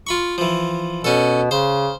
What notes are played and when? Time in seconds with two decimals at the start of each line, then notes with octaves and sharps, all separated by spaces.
0.07 F4 B5 C#6
0.38 E3 F3
1.04 B2 C#4 A4
1.51 C#3 C5